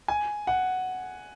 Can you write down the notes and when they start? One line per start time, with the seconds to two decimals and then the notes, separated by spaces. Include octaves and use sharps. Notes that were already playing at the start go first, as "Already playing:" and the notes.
0.08 G#5
0.47 F#5